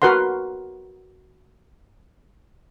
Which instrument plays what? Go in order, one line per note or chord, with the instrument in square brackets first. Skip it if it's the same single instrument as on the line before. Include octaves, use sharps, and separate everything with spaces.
[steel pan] F#4 A#4 B4 F#5 C6